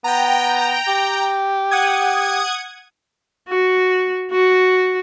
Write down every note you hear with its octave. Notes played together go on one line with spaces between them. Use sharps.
B3 G5 A#5
G4
F#5 D#6 G#6
F#4
F#4